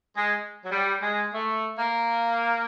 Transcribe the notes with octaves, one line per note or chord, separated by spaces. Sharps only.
G#3
F#3
G3
G#3
A3
A#3